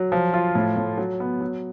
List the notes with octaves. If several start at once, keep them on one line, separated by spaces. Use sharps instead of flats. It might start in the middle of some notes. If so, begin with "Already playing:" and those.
Already playing: F#3
F3
F4
A2
A2
F#3
B3
F#3